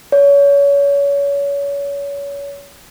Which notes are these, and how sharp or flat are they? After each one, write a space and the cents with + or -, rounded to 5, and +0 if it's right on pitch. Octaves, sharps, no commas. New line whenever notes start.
C#5 +30